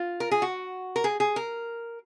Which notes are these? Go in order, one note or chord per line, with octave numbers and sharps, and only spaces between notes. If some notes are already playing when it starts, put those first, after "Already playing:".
Already playing: F4
A#4
G#4
F#4
A#4
G#4
G#4
A#4